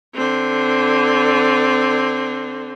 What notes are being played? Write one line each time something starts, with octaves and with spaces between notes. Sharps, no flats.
D3 C4